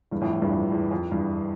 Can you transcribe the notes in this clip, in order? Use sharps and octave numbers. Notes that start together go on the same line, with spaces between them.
E2 G2
F2 A2
F2
E2 G2
F2
E2
F2
E2 G2